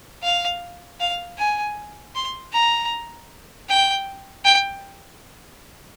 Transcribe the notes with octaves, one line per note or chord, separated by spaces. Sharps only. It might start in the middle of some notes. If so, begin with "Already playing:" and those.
F5
F5
G#5
C6
A#5
G5
G5